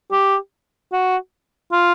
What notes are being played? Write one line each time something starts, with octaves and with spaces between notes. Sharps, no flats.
G4
F#4
F4